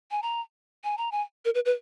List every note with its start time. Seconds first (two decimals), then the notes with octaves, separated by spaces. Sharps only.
0.11 G#5
0.22 A#5
0.84 G#5
0.98 A#5
1.12 G#5
1.45 A#4
1.55 B4
1.65 B4